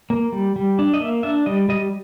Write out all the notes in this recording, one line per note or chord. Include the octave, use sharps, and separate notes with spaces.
A#3
G3
G3
D4
D#5
A#3 E5
D4 E5
G3 D#5
G3 D#5